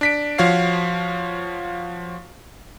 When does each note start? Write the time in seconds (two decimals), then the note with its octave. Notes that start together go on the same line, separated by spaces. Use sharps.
0.01 D4 B6 D7
0.38 F3 F#4 C#5 F5 C7